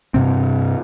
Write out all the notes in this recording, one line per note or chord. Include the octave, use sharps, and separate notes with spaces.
G2 C3 C4